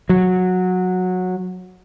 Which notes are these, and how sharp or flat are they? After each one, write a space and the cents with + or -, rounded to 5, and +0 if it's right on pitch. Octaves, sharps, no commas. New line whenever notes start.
F#3 -15